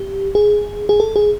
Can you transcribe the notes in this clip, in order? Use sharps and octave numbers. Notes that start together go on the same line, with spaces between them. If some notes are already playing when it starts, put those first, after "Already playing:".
Already playing: G4
G#4
G#4
A4
G#4